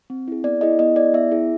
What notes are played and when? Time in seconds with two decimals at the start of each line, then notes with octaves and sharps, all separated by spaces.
0.10 C4
0.28 E4 G#4
0.44 B3 D5
0.61 E4 G#4 D#5
0.79 B3 D#5
0.96 E4 G#4 D5
1.14 B3 E5
1.31 E4 G#4